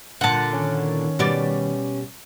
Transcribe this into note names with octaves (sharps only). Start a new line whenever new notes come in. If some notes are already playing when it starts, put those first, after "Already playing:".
A#2 D3 F#5 A5
D#3 C#4
B2 G3 D5